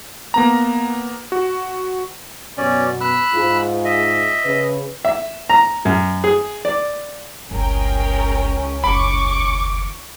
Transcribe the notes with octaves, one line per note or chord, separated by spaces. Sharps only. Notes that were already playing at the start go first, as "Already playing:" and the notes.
A#3 B3 A#5
F#4
F#2 B2 C#4 D5
B5 E6 F#6
G#2 F4 G#4
D#5 E5
C#3 B4
E5
A#5
F#2
G#4
D5
G1 C#2 C#4 G#4 A#4 G5
F#1 D#2 B5 C#6 D6